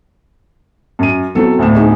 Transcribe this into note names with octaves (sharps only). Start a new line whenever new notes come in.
F#2 D#7
F#3 B3 C4 E4 A4
D2 A2 E7
D#4 G#4 D#5